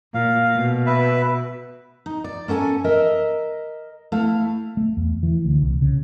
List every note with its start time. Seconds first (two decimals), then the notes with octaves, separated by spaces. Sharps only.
0.14 A#2 F5
0.56 B2
0.86 B4 E5
2.06 D#4
2.24 D5
2.48 A#3 C#4 A4 G5 G#5
2.84 A#4 D#5 E5
4.12 A3 E4 F5
4.77 A3
4.97 E2
5.23 E3
5.45 D2
5.62 C2
5.82 C#3